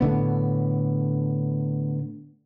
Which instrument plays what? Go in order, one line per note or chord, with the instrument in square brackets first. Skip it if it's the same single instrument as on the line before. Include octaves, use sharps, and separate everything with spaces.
[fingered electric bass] A2 D3 B3